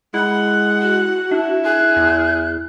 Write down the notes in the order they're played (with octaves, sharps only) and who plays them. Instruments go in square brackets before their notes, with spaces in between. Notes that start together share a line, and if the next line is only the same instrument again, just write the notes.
[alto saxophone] G#3 [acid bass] E4 [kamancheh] F#5
[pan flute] F#4
[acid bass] D4 [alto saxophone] E4
[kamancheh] G#4 [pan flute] F#6
[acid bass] E2